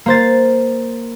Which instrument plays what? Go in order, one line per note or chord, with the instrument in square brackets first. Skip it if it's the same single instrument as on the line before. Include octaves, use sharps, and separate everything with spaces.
[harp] A#3 C5 A6